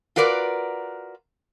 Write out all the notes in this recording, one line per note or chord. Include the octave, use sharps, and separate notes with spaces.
F4 F#4 A#4 B4 D5